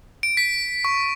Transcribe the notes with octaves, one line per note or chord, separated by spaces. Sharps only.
D7
B6
C#6